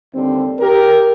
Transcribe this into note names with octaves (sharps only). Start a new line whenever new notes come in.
D#2 D3 G3 C4
G4 A#4